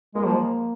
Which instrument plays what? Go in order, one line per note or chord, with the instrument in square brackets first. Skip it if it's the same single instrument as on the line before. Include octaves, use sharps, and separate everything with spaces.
[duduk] G#3 [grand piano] A#3
[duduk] F3